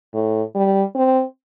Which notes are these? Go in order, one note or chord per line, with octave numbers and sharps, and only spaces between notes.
A2
G3
C4